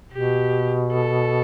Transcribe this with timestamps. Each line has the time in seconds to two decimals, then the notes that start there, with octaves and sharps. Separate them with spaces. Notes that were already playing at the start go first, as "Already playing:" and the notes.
0.12 B2 G4
0.93 A4